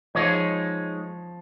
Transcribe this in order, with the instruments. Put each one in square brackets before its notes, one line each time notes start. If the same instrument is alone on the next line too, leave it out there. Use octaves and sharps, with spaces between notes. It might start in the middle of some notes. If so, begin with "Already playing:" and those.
[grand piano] F3 [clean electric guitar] G#3 D#4 G#4 C#5